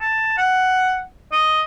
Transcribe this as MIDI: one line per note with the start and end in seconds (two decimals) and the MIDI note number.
0.01 0.33 81
0.38 1.01 78
1.32 1.62 75